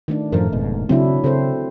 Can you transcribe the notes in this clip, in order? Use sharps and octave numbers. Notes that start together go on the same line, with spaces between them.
D#3 A3 D4
F#2 A2 F3 A3 A#4
F1 G#2 B2
C#3 F#3 C4 D4 E4
C#3 C4 A4 C5